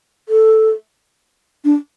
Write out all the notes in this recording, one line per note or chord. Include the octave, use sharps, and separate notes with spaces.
A4
D4